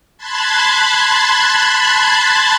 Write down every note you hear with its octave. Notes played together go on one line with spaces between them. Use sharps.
A5 B5 C6 F#6 G#6 A6